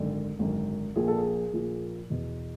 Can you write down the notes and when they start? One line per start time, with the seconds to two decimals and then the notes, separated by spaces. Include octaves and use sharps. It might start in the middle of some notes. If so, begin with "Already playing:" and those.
Already playing: G#1 F#2 D3
0.39 G#1 F#2 D3
0.96 A#1 A#2 F3 G#4
1.08 A4
1.18 G#4
1.53 A#1 A#2 F3
2.10 E2 B2